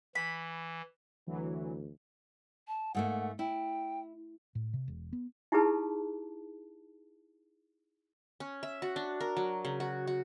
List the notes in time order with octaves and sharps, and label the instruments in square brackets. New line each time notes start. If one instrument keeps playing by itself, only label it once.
[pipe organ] E3 [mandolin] B5
[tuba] D2 [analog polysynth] E3 F#3
[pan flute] A5
[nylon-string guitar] G#2 A3 A#3 [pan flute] F#5
[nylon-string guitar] E4 [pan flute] G5
[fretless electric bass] A2
C3
E1
B3
[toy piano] D#4 E4 G4 G#4 B4 A5
[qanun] C#4
E5
F#4
D4
A#4
F#3
C#3
F#4
F#4